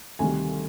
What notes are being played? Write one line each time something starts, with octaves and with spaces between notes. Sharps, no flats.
D2 C3 D#3 G3 G#5